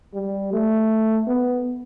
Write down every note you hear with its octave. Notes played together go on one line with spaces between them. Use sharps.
G3
A3
B3